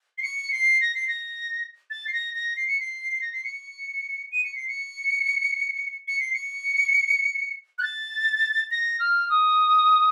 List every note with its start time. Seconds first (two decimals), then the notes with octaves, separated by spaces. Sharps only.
0.18 C7
0.22 C#7
0.52 C7
0.81 A#6
0.95 C7
1.08 A#6
1.90 A6
2.08 C7
2.13 A#6
2.34 A#6
2.56 C7
2.68 C#7
2.80 C7
3.22 A#6
3.33 C7
3.44 C#7
4.32 D#7
4.44 C#7
4.56 C7
4.68 C#7
6.08 C#7
6.20 C7
6.34 C#7
7.79 F#6
7.83 A6
8.71 A#6
9.00 F6
9.30 D#6